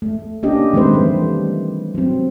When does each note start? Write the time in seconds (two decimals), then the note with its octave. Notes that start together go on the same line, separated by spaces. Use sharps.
0.02 A3
0.43 A#3 C#4 D4 G4 D#5
0.73 D#3 G#3 A3 C4 B4 C5
0.94 E3 G3 A3
1.95 F#3 C4